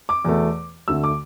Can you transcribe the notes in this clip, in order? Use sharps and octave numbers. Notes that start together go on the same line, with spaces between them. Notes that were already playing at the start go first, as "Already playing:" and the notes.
D6
E2 B2 A3
D2 D3 A3 E6
D6